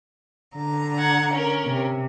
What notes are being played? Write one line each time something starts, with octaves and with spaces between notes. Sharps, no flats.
D3 A#5
F#5 G#6
C#4 A#4
C3